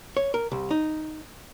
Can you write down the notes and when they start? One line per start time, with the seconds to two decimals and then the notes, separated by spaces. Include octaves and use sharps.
0.17 C#5
0.34 A#4
0.52 C2
0.71 D#4